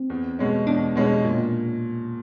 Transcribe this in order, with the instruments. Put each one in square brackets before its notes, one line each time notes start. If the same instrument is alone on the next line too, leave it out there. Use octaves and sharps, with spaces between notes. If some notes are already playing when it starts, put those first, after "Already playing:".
Already playing: [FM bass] C4
[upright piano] E2
B2 G#3 C#4
[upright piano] E2 [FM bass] D4
[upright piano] B2 G#3 C#4
A#2